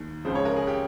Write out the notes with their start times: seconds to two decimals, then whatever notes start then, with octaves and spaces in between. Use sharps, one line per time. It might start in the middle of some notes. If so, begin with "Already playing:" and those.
Already playing: D#2 D#3
0.25 C#2 C#3 F3 C5
0.35 C#5
0.45 A#4
0.56 G#4
0.67 G4